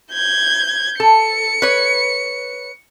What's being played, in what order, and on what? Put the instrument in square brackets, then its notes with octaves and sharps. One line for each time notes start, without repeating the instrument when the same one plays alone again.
[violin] G6 G#6
[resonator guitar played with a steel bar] A4 [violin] C#7
[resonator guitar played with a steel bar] B4 C#5